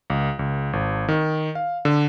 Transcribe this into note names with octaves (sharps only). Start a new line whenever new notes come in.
C#2
C#2
G#1
D#3
F5
D3